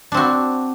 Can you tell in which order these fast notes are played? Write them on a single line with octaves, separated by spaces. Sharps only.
D4 C4 F#4